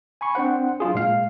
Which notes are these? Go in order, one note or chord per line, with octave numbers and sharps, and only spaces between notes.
G#5 B5 C#6
C4 D4 C5 F#5
F#3 D4 F4 G#4
A#2 G#3 F5